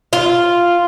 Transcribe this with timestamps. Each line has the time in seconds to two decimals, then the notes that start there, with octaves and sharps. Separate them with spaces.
0.13 F4